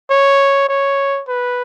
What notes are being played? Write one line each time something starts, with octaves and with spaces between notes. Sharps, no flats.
C#5
C#5
B4